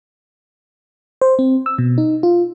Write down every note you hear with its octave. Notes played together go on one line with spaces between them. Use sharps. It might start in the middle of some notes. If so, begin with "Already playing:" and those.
C5
C4
E6
B2
D#4
F4